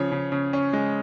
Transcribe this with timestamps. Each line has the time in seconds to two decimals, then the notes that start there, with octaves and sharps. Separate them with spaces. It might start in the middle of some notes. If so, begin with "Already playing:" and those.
Already playing: C#3 F3 C#5
0.12 C#3
0.32 C#3
0.53 C#4
0.73 G#3